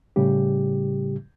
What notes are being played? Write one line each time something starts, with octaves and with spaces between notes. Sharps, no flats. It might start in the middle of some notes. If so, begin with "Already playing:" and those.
A2 C#3 G3 G4